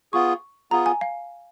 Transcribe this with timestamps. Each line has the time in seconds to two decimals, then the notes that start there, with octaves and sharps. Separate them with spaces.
0.13 B3 F4 G#4 C#6
0.71 B3 F4 G#4 A#5
0.86 G#5
1.01 F5